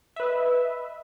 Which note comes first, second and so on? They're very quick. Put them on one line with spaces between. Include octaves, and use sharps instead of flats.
E5 B4 D#5